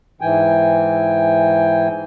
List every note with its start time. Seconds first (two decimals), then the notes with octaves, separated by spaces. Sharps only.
0.21 G#2 E3 G5 G#5